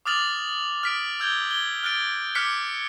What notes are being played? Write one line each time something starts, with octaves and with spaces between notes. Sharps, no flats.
D6 D#6 F6 A6 F7 F#7
F6 B6 D7
E6 G6 G#6 G7
G7
F6 F#6 A6 D7
D6 F6 F#6 B6 C#7